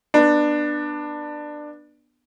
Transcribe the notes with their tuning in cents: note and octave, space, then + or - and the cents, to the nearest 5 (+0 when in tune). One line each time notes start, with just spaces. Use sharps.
B3 -15 D4 +20